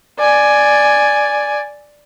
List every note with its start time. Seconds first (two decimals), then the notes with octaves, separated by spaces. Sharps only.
0.19 D5 G#5